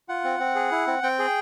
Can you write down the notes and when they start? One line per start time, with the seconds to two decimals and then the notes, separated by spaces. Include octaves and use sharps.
0.09 F4 F#5
0.24 C4
0.40 C4
0.55 G#4
0.72 E4
0.87 C4
1.03 C4 G5
1.19 G#4